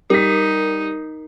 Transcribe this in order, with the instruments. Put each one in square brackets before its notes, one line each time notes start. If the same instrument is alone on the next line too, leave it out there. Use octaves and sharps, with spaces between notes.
[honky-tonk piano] G3 B6 [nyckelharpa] D#4 [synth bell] A#4